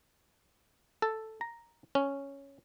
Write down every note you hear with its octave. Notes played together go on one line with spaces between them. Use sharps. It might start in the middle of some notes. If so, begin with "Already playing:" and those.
A4
A#5
C#4